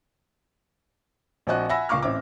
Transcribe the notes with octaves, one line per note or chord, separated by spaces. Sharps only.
A#1 F3 C4 F#4 D#5 F#6
E5 F#5 G#5 B5 E6 A#6
C#2 A#2 F5 C#6 D6 F6
A1 C4 E5 D6